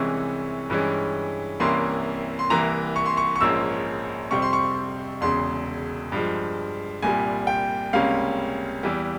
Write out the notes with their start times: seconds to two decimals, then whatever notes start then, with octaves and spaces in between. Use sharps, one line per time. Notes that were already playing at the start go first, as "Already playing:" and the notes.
Already playing: C2 C3 E3 G#3 C#4 C#6
0.70 G2 E3 G#3 C#4
1.60 C2 C3 E3 A#3 C#4 C6
2.39 C6
2.50 C2 C3 E3 A#3 A#5
2.96 C#6
3.06 C6
3.17 C#6
3.36 C#6
3.40 A#1 G#2 F3 A#3 C#4 E6
4.31 F2 C3 G3 C4 C#6
4.42 C6
4.53 C#6
5.21 E1 E2 C#3 C6
6.12 G2 F3 G#3
7.02 C2 A#2 G3 G#5
7.47 G5
7.93 C#2 C3 G3 A#3 C#4 F5
8.83 E2 E3 G3